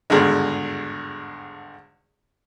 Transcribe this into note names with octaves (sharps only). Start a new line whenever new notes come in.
G#1 E2 G2 D3 G#3